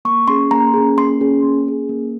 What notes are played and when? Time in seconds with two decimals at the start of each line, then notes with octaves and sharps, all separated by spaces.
0.05 A#3 C#6
0.28 C#4 G#4 C6
0.51 A#3 A#5
0.74 C#4 G#4
0.97 A#3 C6
1.21 C#4 G#4
1.43 A#3
1.66 C#4 G#4
1.89 A#3